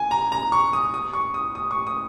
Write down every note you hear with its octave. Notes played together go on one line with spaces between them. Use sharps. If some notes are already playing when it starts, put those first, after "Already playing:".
Already playing: G#5
A#5
A#5
C#6
D#6
D#6
C#6
D#6
D#6
C#6
D#6